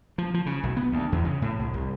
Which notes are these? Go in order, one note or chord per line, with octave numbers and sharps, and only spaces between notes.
F3
F3
C#3
B1
B3
D2
E2
C#3
A2
C2
C2